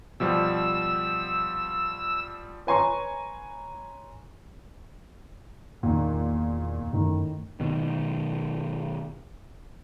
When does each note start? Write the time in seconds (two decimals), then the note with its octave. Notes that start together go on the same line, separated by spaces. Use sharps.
0.20 B2 F3 G3 E6
2.67 B4 C#5 G#5 A#5 C6 C#6
5.83 E2 A#2 D#3
6.93 F#2 A2 D#3
7.60 B2 D#3